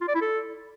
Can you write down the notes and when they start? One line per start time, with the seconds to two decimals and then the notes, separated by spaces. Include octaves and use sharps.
0.01 F4
0.08 D5
0.15 E4
0.22 A4